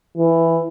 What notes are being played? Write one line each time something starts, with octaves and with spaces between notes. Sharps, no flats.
E3